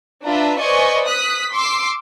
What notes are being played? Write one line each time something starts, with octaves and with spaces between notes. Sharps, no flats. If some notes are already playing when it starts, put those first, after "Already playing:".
D4 F4 B4 E5 A#5
B4 C5 D5 D#5 G#5 C#6
D#6 F#6 B6
C6 D6 E6 C7